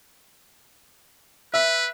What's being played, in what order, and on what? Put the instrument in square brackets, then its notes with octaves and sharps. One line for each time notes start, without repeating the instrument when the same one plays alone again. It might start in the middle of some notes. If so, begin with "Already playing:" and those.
[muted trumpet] B4 [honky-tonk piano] E5